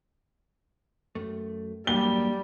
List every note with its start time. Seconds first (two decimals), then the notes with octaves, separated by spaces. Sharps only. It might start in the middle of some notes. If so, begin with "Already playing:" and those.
1.15 F#2 A3
1.87 A1 G2 F#3 G3 A#3 G7